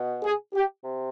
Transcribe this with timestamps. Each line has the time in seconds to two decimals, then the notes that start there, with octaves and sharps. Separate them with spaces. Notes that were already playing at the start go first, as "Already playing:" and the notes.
Already playing: B2
0.24 G#4
0.54 G4
0.84 C3